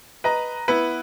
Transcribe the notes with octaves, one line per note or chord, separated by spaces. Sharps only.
B4 D#5 A#5
B3 E4 B4